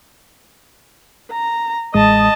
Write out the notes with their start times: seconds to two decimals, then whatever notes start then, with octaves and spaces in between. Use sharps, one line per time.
1.31 A#5
1.94 A1 G#3 D#5 A5 D#6